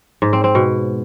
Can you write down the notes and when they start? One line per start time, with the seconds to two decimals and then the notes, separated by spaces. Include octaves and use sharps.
0.22 G#2
0.33 C4
0.44 C4
0.55 B2